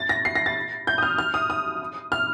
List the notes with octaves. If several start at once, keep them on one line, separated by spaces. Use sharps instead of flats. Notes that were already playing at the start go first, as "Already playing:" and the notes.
Already playing: A6
A#6
C7
A#6
A6
G6
D#6
F6
F6
D#6
D#6
F6